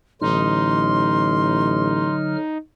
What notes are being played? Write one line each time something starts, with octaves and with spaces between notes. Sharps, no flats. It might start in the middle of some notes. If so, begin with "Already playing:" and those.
A1 D3 F#3 D#4 C6 F6